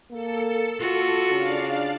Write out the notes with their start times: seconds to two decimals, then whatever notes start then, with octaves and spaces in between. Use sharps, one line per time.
0.12 A#3 A4 C#7
0.79 F4 F#4
1.31 C#3 D4 D5 F5